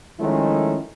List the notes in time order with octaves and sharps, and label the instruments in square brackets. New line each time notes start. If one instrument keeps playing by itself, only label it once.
[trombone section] D#3 F3 G#3 A3 C#4 E4